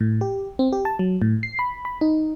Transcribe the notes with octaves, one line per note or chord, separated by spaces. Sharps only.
A2
G4
C4
G4
A5
F#3
A2
C7
B5
B5
D#4